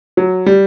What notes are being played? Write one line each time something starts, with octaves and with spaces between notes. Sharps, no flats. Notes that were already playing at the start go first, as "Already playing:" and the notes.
F#3
G3